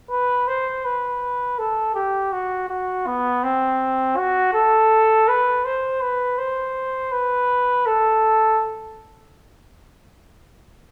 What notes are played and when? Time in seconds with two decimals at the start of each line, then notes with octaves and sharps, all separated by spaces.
0.11 B4
0.48 C5
0.85 B4
1.59 A4
1.95 G4
2.32 F#4
2.69 F#4
3.07 B3
3.43 C4
4.17 F#4
4.54 A4
5.28 B4
5.65 C5
6.01 B4
6.38 C5
7.12 B4
7.86 A4